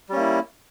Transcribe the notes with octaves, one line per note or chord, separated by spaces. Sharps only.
G3 A#3 C#4 E4